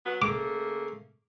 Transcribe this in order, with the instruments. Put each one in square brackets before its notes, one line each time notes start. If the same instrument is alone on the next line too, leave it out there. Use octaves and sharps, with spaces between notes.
[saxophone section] F#3 B3
[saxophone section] C#3 A3 A#3 [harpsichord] D6